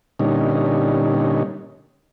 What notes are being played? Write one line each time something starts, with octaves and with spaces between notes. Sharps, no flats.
A#2 D3 G3 C#4 D#4